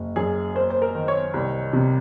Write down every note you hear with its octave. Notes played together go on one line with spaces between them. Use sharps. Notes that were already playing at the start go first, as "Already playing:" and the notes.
Already playing: F#1
F#2 G#4
A#3 C5
C5
A#4
D#3
C#5
C2
C3